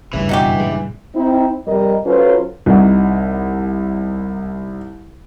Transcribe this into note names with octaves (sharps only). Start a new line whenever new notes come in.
F#1 D2 G2 C#3 E3
F#1 B2 D#4 F#4 G4
A#2 G3 G#3
C4 D#4 E4
F2 C3 G3 A#4 D#5
F#3 C#4 F4 A4 B4 C5
C2 D#4 F#5